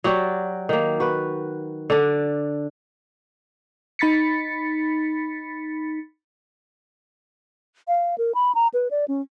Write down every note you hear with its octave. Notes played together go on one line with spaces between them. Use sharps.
F#3 F#4 G4 D5
D#3 A#3
F#4 B4
D3 D4
D#4 B5 A6 B6 C#7
F5
A#4
B5
A#5
B4
D5
C#4